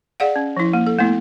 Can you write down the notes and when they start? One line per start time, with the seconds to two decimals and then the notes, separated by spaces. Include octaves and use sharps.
0.20 G#4 D5 F5 F#5
0.36 C#4
0.57 F3 E4
0.73 A#3
0.87 A4
0.99 A3 B3 E4